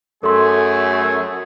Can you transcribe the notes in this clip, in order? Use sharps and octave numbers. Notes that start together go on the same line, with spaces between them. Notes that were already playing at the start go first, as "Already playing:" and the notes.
F#2 A3 G#4 A4 C6